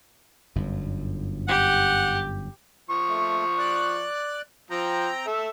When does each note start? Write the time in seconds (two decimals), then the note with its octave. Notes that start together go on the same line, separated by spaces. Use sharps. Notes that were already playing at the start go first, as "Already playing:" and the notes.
0.56 G1 F#2
1.48 G4 F#5
2.90 F3 C#6
3.08 A3
3.58 D5 F#6
4.71 F3 C4 G5 A#5
5.27 A4 E5